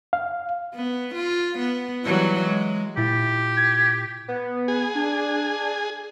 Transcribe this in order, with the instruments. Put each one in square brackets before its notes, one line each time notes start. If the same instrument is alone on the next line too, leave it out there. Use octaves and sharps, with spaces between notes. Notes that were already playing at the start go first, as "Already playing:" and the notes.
[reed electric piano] F5
[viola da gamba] B3
F4
B3
E3 F#3 G3
G#3
[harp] A#2 E4 A6 [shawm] G4
[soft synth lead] G#6
[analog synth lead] B3
[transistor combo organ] G#4
[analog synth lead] D4